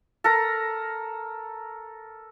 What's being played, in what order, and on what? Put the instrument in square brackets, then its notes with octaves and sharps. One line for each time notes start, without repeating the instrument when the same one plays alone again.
[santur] A4 A#4 A#5